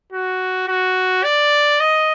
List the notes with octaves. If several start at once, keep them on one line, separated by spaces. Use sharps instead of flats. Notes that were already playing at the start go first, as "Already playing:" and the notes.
F#4
F#4
D5
D#5